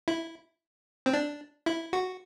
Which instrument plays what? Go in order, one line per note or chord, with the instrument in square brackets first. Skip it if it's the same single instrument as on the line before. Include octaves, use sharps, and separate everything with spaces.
[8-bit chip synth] E4
C4
D4
E4
F#4